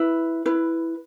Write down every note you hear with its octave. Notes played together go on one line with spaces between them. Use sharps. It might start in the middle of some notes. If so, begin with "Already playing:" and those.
Already playing: E4 B4
E4 B4